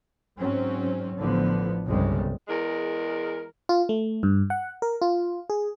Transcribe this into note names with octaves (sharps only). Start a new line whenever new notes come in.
G#2 F#3 C4 C#4
A1 D3 F3 B3
G1 C2 C#3 G3 G#3
E2 G#3 A#4
F4
A3
G2
F#5
A#4
F4
G#4